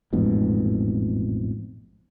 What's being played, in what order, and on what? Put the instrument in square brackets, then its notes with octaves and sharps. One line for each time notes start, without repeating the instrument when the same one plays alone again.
[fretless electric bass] A1 F2 G#2 B2